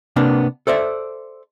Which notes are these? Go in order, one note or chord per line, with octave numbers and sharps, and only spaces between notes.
C3 A#3 B3 D4
A4 C5 D5 E5